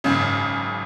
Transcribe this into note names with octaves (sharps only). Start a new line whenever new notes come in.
G#1 F#2 C#3